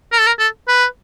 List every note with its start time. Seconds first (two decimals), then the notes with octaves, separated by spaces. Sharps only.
0.12 A#4
0.19 A4
0.27 A#4
0.39 A4
0.68 B4